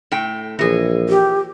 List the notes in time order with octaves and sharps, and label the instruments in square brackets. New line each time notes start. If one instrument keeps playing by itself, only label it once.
[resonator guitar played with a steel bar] A2 G5
[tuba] A#1 [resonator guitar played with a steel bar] E3 G#4
[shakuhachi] G4